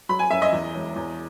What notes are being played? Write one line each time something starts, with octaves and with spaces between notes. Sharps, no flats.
F#3 B5
G#5
F#2 E5
D#5
E2
E1
E2